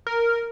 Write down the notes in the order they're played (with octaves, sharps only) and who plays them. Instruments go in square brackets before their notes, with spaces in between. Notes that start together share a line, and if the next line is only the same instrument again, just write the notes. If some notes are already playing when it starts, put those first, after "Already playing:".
[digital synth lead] A#4